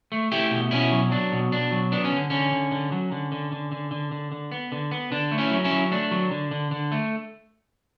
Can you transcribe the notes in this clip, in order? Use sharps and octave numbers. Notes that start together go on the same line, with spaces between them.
A3
A3 E4 G4
B2
B2 C#4 E4
F#3
F#3 D4
B2
B2 D4
F#3
B3 D4
C#4
D3
D3 C#4
D3
D3
F#3
D3
D3
D3
D3
D3
D3
D3
B3
D3
B3
D3 D4
A3
C#4 E4
F#3
C#4 E4
F#3
A3 D4
F#3
D3
D3
D3
A3